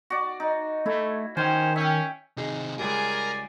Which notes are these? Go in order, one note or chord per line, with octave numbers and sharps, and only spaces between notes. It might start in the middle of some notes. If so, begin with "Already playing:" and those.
F#4 D5
D#4
A3 E4
D#3 C#4 C5 G5 G#5
C#4 E5 G5
C3 D#3 D#4 G#4
C#2 G3 G#4 A#4 D5 G#5